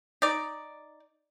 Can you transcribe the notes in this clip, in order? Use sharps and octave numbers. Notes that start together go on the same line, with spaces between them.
D#4 D5